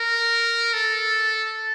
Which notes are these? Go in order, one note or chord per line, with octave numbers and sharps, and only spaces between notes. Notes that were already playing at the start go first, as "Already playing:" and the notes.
Already playing: A#4
A4